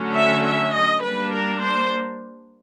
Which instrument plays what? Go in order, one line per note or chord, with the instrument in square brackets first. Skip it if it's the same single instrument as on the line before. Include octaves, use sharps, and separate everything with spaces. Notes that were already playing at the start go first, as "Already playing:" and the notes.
Already playing: [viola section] D3 F#3 A3 C#4
E5
E5
D#5
G3 A#3 D4 B4
A#4
C5